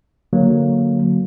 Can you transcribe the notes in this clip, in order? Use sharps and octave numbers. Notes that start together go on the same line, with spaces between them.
D3 F#3 A#3